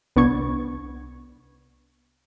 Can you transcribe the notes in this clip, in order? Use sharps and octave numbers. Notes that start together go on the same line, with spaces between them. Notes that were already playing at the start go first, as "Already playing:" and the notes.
C2 B3 D4 C#6 G#6